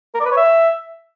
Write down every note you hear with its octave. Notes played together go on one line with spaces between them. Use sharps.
A#4
D5
B4
C#5
E5